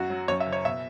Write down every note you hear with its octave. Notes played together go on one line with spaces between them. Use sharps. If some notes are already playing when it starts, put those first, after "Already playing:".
Already playing: F#2 F#4
F#3
F#2 C#5
E5
F#1
C#5
B2 E5